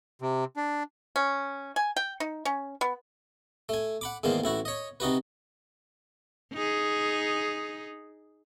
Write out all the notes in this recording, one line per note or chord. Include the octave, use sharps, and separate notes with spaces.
C3
D4
C#4
G#5
G5
D#4
C#4
B3
A3 G#5
F#5 B5 D6
E2 G#2 D#3 A#3 C5
A1 E4 F#4
C#5 D#5
C3 D#4 F#4 B4
D#4 G#4